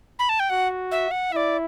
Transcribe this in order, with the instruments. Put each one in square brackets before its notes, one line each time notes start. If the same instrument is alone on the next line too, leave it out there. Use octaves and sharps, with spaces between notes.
[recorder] B5
A5
G5
[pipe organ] F#4 [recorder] F#5
[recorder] E5
F#5
[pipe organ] E4 [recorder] E5
[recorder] D5